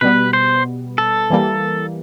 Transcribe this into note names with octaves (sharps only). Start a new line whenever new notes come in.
B2 G3 B3 B4
C5
A4
E3 G3 A#3